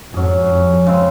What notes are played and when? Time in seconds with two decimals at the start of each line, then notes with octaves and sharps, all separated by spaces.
0.13 F2 G#2 F#3 C#4 G#4
0.50 F2
0.86 C#3 G#3 C4